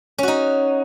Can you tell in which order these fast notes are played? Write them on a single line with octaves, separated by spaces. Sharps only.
C#4 F#4 D#4